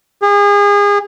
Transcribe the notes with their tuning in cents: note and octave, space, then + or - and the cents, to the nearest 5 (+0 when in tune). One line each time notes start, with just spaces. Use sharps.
G#4 -35